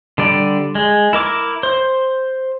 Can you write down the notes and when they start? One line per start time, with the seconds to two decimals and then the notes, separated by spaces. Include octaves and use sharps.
0.18 D3 G3 D5
0.75 G#3
1.13 E4 A#4 D6
1.63 C5